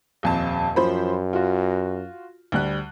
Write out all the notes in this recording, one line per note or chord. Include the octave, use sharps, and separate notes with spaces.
D#1 F2 A5
F#2 F3 C5 B5
F4 F#4
D2 G3 F#6